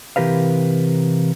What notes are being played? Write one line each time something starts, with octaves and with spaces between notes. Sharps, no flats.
C3 E3 G4 A#4 B4 F5